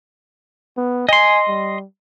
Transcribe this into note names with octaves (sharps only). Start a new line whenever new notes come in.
B3
D#5 G#5 C6
G3